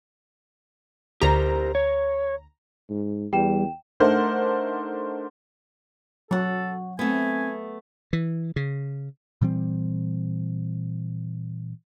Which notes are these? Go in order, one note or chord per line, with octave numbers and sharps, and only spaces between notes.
D2 G4 A#4 C5 A#5
C#5
G#2
E2 G3 G5 E7
A3 D4 D#4 A#4 C5 F#5
F#3 A4 C#5 F#5
A3 B3 C4 G#5
E3
C#3
A#2 E3 G3 C4